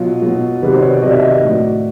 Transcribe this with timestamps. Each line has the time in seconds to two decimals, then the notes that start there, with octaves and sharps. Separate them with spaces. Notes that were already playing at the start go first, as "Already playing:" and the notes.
Already playing: B2 F#3 F4
0.22 B2 F#3
0.62 C3 D#3 F#3 B4
0.72 C5
0.82 C#5
0.93 D5
1.03 C3 D#3 F#3 D#5
1.12 E5
1.23 D#5
1.33 D5
1.44 A2 F#3